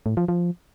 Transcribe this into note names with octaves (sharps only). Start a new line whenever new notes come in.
A2
F3
F3